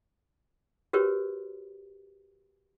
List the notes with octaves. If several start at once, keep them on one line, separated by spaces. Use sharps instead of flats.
F#4 G4 A#4 B4 C#5